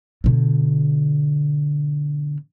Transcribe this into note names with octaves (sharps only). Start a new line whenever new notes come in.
B2 D3